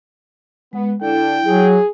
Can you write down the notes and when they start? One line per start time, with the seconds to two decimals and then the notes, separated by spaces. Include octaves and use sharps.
0.73 G#3 B3
1.02 D3 D4 E4 A4 G5
1.45 F#3 G#4